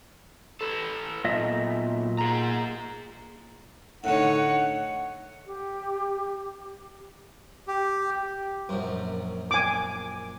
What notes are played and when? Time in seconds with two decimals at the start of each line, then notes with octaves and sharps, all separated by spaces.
0.61 A4 B4
1.25 B1 A#2 D#5 E5
2.18 G#4 A#5
4.04 A2 D3 D#4 C#5 F#5
4.37 F#5
5.47 G4
7.68 G4
8.69 A#1 F#2
9.51 G#5 D6